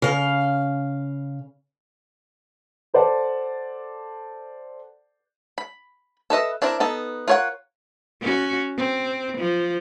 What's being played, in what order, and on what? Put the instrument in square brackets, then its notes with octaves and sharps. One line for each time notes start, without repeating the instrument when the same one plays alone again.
[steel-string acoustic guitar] C#3 F5
[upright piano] A4 C5 D5 F#5 A5
[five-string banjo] B5
A4 B4 D#5 E5
C4 D4 E4 A#4
B3 D#4 A4
F4 A#4 C#5 E5 F#5
[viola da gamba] C#4 F#4
C4
F3